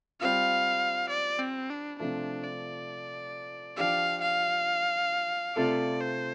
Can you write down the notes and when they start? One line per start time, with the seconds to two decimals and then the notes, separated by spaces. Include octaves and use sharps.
0.21 G3 C4 F4 F5
1.10 D5
1.39 C4
1.70 D4
1.99 C3 F3 A3 D4
2.44 D5
3.77 F3 D4 G4 F5
4.22 F5
5.56 C3 A3 F4 A4 D5
6.01 C5